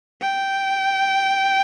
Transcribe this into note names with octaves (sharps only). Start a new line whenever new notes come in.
G5